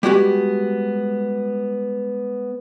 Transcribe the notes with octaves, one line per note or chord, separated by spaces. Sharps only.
G3 G#3 B3 F#4 G4